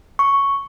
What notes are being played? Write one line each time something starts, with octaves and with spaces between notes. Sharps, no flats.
C#6